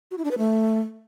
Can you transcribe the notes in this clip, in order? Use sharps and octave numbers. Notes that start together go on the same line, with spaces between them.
F#4
E4
D4
B4
A3